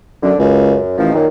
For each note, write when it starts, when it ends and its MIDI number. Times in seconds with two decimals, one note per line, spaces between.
0.23 0.33 42
0.23 0.36 50
0.39 0.78 37
0.39 0.96 42
0.98 1.13 33
0.98 1.12 51
0.98 1.12 53
1.15 1.25 42
1.15 1.25 46
1.15 1.28 51